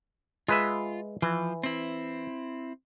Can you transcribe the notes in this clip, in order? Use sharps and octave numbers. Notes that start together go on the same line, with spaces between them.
G#3 F4 B4 E5
E3 F3
C4 E4